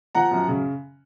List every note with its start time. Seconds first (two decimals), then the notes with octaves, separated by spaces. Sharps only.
0.15 F3 F#5 A#5
0.31 F#2
0.48 C#3